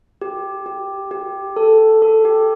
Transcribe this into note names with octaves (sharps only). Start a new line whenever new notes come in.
G4
G4
G4
A4
A4
G4